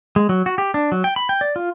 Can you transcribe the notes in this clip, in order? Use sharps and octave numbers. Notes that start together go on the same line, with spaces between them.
G#3
F#3
F#4
G4
D4
F#3
G5
B5
G5
D5
F4